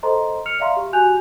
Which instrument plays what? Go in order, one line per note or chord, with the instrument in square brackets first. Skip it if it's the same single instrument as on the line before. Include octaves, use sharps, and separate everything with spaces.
[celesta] A4 C5 D#5 A#5 C6
F6 C#7 F7
D5 E5 F5 A#5 C6
G4
F#4 G4 G#5 F#6 G6 F7